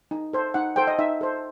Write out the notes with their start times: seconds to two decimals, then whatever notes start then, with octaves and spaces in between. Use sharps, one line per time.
0.11 D#4
0.33 A4 C5
0.54 D#4 F#5
0.76 A4 C5 G5
0.87 D#5
0.99 D#4 E5
1.21 A4 C5